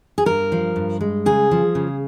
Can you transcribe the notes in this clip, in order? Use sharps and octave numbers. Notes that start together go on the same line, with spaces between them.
G#4
G2 A#4
F3
G2
G#3
C#3 G#4
F3
C#3